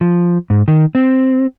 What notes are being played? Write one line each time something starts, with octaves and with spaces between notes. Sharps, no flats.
F3
G#2
D#3
C4